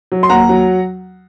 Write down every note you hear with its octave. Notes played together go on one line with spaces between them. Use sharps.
F#3
C6
D#2 F#5 A#5
F#3